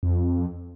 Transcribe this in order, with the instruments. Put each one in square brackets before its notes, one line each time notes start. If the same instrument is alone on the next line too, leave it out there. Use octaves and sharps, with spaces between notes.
[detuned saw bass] F2